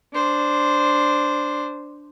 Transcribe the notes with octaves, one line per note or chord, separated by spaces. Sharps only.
D4 C5